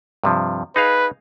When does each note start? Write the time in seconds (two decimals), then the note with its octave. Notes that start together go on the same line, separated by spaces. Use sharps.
0.24 G2 C3 F3
0.76 D#4 G#4 B4 F5